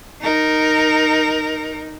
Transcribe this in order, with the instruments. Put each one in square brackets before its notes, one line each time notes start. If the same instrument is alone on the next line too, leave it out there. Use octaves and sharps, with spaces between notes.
[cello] D#4 A#4